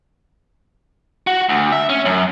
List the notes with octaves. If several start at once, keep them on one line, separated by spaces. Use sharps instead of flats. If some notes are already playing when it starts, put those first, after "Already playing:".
F#4
D2
E5
C#4
F#2